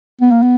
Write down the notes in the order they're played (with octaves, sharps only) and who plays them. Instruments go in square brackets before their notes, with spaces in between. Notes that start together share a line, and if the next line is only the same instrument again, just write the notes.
[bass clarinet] B3
A#3
B3